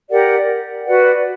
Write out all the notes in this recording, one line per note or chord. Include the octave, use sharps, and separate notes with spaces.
G4 A#4 D5 F#5
F#4 B4 D5 F#5